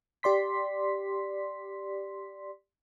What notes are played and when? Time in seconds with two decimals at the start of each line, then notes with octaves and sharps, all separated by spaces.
0.23 G4 D5 C6 B6